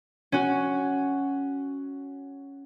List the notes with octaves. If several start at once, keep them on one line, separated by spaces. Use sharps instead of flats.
C#4 F#4